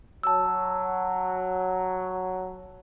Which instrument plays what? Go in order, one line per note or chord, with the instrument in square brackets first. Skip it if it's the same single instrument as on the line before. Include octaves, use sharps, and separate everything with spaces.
[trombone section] F#3 [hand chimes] A5 E6